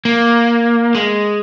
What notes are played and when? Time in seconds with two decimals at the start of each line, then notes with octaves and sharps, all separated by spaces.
0.05 A#3
0.95 G#3